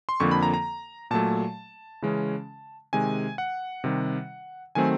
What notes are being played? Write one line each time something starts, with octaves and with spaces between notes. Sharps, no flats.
C6
F2 D3 F3 A#3 C#6
B5
A#5
A#5
A#2 F#3 A3 A5
C#3 E3 G#3 C#4
C3 D#3 G#3 G#5
F#5
C3 D#3 G3
D#3 F#3 A3 C4 G#5